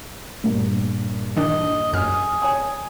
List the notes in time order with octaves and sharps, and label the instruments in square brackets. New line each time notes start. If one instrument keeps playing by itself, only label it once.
[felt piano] G2 A#2 A#3
[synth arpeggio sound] D#3 D4 [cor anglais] D#5
[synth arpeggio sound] F#2 F6 [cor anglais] G#4
[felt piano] C#5 G#5 D#6